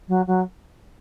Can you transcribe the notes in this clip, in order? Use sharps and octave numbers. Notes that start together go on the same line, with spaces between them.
F#3
F#3